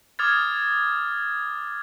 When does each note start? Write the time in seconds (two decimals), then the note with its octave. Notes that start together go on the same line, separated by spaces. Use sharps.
0.19 D6 D#6 F6 G#6 A6